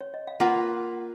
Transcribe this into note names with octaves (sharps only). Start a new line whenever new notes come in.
C#5
D#5
F5
A#3 F4 B4 F#5